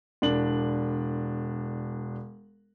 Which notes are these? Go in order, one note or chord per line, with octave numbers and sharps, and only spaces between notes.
E1 D4 F#7